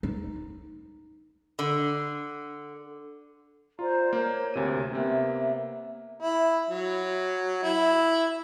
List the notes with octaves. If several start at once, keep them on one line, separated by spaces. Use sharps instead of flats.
D#4
D3
F4 C5 D5 A#5
A#3 A#4 C#5
D2 C3 D#7
C3 A#3 B3 E5
E4
F#3
E4